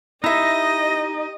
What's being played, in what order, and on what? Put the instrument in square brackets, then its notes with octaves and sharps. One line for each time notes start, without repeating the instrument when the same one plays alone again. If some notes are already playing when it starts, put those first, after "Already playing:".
[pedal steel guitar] D#4 [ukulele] E4 E5 [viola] G4 D#5 [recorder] A#6